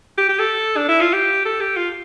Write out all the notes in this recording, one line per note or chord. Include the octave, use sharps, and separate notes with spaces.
G4
G4
A4
D4
E4
F4
G4
A4
G4
F4